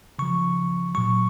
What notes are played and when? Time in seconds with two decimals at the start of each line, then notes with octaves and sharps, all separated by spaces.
0.19 C#3 F3 C#6
0.95 A#2 F#3 C#6